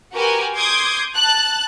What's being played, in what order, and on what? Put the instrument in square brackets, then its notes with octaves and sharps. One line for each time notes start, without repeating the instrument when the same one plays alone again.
[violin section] F#4 G4 A#4 B4 G#5
C6 D6 D#6 G6 G#6
A5 F#6